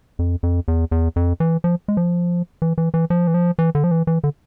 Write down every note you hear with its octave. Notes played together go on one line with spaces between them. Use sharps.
F2
F2
E2
E2
F2
E3
F3
G#3
F3
E3
E3
E3
F3
E3
F3
E3
D3
F3
E3
E3
D3